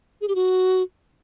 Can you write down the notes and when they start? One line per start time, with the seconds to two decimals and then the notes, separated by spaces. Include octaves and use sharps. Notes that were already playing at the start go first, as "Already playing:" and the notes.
0.21 G#4
0.28 G4
0.35 F#4